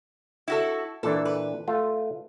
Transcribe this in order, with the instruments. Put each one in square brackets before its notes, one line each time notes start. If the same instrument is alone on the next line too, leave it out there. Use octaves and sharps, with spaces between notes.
[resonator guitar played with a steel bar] E4 F#4 A4
[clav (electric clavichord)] A#2 E3 D4 [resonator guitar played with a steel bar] A4
[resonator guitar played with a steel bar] B4
[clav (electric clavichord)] A3 F4